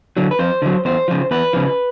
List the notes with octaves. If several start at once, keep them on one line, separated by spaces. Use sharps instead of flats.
D3 F#3
B4
F2 C5
D3 F#3
E2 C5
C#3 F3
E2 B4
C#3 F3